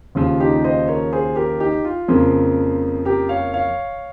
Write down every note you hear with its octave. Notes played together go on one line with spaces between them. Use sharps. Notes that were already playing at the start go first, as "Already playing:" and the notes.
D#2 C#3 F3 F4
D#4 G4
C5 D#5
A#4 C#5
G#4 C5
G4 A#4
D#4 G4
F4
F2 C#3 F3 A#3
G4 A#4
C#5 F5
C#5 F5